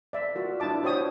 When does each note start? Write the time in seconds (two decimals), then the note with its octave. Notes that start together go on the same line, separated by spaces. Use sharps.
0.13 D5 E5
0.35 F4 F#4 A#4
0.60 D4 E4 D5 A5 D6
0.83 F4 F#4 C5 C#5 G5 D#6